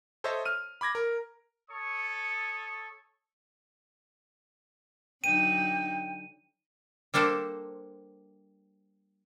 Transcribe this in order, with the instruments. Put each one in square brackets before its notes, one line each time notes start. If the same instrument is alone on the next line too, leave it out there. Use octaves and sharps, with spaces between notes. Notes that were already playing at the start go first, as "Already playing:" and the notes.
[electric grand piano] A4 C5 C#5 D#5 E5 A5
F6 D#7
B5 D6 G#6 A#6
A#4
[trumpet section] A4 C#5 C#6 D#6
[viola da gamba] D3 F#3 D#4 [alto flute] G5 [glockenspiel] D#7
[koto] G3 A#3 D4 A4 C5